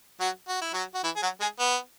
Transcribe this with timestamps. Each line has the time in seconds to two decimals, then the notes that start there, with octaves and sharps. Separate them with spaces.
0.20 F#3 F#4
0.48 F#4
0.61 E4
0.74 F#3 F#4
0.94 F#4
1.04 E3 E4
1.16 G#4
1.23 F#3 F#4
1.40 G#3 G#4
1.59 B3